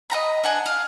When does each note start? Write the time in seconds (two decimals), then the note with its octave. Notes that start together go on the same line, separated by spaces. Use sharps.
0.10 D#5 F#5 A#5 B5
0.44 D4 F#5 G#5
0.66 F5